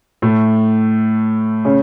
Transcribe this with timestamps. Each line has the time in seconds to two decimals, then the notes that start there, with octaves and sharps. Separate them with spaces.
0.22 A2 A3
1.65 C#3 C#4